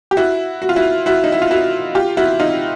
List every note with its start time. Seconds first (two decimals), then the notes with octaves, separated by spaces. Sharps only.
0.11 G4
0.17 E4 F#4
0.62 F#4
0.69 F4
0.76 E4 F#4
1.06 E4 F#4
1.24 D#4
1.32 E4
1.42 F4
1.51 E4 F#4
1.95 F4 G4
2.17 E4 F#4
2.40 D#4 F4